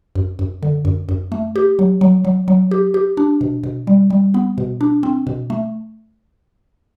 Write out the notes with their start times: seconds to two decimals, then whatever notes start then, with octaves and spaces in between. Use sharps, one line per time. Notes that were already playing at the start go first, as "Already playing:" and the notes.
0.15 F#2
0.39 F#2
0.63 D3
0.85 F#2
1.09 F#2
1.32 A3
1.56 G4
1.79 F#3
2.01 F#3
2.25 F#3
2.48 F#3
2.71 G4
2.94 G4
3.17 D4
3.41 B2
3.64 B2
3.87 G3
4.10 G3
4.34 B3
4.58 B2
4.81 D4
5.03 C4
5.27 B2
5.50 A3